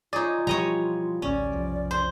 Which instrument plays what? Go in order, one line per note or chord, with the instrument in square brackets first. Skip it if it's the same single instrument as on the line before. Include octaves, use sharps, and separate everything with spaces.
[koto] D#4 G#4 [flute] F4 [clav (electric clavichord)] C#5 D5
[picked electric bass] B2 E3 F3 [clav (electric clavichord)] G3 [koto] C#5 D#5 A#5
[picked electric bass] A1 D2 [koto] C#4 [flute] D5
[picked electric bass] F1 B1 F3
[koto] C5